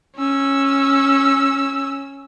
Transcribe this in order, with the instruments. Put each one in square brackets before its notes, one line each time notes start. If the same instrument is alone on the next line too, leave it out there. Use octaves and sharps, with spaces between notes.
[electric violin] C#4 E6